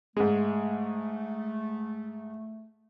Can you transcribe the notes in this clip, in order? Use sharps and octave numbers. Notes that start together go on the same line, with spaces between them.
G#2 G#3 A3